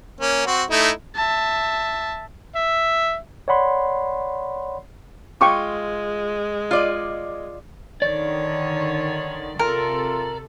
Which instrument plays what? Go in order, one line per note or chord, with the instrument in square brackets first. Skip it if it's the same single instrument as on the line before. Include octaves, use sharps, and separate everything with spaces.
[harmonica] A#3 C#4
C4 F#4
A3 D#4 E4
[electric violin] E5 A5
[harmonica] E5
[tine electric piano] C#5 D5 F#5 B5 C6
[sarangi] G#3 [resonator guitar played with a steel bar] F4 [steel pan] G5 C#6 D6
[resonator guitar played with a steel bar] F4 D5 D#5
[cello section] D3 D#3 [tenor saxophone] C#5 [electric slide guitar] D5
[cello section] C3 A4 [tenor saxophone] F4 [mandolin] A#4